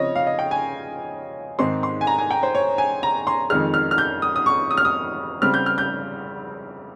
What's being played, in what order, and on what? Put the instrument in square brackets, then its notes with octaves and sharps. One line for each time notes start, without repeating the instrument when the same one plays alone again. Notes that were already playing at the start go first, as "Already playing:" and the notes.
Already playing: [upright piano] C#3 F3 C4 D#4 C#5 D#5
F5
D#5
G5
G#5
G#2 D#3 G#3 C4 D#4 C6
C6
G#5
A#5
G#5
G5
C5
C#5
G#5
A#5
C6
F2 D#3 G#3 F6
F6
F6
G6
D#6
D#6
C#6
D#6
F6
D#6
C#3 G3 C4 F6
G6
F6
G6